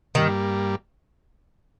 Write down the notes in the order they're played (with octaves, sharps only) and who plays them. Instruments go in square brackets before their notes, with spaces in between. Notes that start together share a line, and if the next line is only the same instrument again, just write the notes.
[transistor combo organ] G2 G3 A#3 [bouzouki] D#3